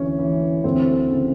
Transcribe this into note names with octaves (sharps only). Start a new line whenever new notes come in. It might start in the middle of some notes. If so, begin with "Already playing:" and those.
Already playing: D2 E3 C#4
E3
D2 C4
C#3